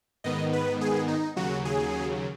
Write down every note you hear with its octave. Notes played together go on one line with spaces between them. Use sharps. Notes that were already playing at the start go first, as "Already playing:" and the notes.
G#2 D#3 B3 D#5
B4
G#4
D#4
D#2 C#3 F#3 F#4
G#4